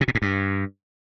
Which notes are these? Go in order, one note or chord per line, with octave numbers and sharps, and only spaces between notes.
C3
B2
G#2
G2